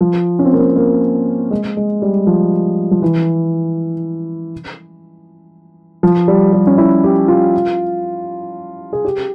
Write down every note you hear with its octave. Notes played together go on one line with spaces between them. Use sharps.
F3
C#4
C4
A#3
C4
A#3
G#3
G#3
G3
F3
F3
E3
F3
G3
G3
C#4
E4
G4
F4
G#4
G4